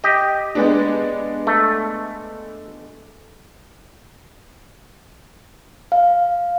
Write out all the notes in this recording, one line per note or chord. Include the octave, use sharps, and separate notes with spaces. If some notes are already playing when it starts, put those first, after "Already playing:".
G4 D#5
G#3 B3 D4
A3
F5